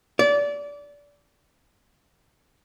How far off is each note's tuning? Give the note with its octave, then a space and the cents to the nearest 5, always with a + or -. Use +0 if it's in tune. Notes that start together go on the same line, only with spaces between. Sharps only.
D5 -25